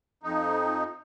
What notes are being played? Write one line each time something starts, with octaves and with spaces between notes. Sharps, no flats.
F2 D#4